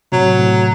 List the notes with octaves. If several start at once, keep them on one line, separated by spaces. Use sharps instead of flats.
A2 C3 F#3
A2 C3